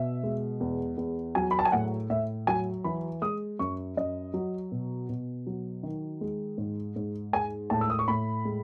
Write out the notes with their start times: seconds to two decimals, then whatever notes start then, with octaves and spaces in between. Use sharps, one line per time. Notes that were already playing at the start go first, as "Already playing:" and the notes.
Already playing: B2 E5
0.23 G#3
0.60 E2
0.97 E2
1.35 F#3 G#5
1.51 B5
1.59 A5
1.65 G#5
1.72 A2 F#5
2.10 A2 E5
2.47 F#3 G#5
2.84 E3 B5
3.22 G#3 D#6
3.59 F#2 C#6
3.97 F#2 D#5
4.34 F#3
4.72 B2
5.09 B2
5.47 F#3
5.83 D#3
6.21 G#3
6.58 G#2
6.96 G#2
7.33 G#3 G#5
7.70 A2 A5
7.81 E6
7.90 D#6
7.99 C#6
8.08 A2 B5
8.45 G#3